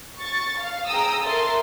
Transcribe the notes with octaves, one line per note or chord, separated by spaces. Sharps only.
C#6 A6
F5
G#4 G5 A#5 D#6 E6
A4 A#4 E5 C6 A6